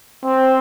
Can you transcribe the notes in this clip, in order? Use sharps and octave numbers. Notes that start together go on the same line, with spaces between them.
C4